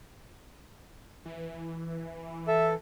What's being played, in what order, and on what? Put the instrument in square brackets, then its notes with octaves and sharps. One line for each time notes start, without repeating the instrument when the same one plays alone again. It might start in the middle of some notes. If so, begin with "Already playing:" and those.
[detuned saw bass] E3
[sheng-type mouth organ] A4 [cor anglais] E5